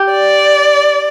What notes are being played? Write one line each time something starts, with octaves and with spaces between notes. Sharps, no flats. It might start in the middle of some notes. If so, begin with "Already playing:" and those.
Already playing: G4
D5